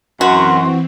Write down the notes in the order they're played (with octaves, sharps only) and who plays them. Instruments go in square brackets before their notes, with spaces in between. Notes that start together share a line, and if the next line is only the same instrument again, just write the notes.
[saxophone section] F#2 [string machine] E3 C4 [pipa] F#4 [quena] C6